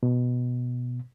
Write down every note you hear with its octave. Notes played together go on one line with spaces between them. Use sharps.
B2